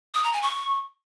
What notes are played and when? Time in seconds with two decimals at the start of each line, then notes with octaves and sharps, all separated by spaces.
0.14 D#6
0.24 A#5
0.33 G#5
0.42 C#6